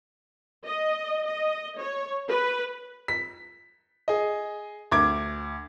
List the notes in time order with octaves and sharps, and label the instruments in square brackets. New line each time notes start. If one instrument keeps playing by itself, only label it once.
[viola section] D#5
D#5
C#5
B4
[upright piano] B6
G#4 D#5
D2 D6 G#6